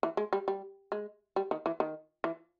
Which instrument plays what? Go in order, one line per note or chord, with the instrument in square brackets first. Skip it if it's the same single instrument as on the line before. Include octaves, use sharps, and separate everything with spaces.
[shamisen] E3
G#3
G3
G3
G#3
G3
D#3
E3
D#3
E3